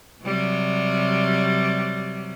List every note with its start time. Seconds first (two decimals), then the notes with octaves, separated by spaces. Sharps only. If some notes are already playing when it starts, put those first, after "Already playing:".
0.23 C3 F#3 G3